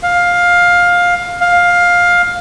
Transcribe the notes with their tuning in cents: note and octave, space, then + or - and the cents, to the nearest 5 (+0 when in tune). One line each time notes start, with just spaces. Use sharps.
F5 +15
F5 +15